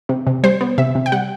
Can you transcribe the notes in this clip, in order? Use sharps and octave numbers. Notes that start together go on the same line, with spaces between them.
C3
C3
G3 C5
B3
C3 E5
C3
G5
G3 F#5